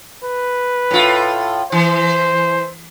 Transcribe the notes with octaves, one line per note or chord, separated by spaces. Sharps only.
B4
A2 F4
E3 C5